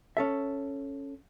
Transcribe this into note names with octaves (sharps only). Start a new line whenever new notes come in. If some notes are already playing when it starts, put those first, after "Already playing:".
C#4 A4 E5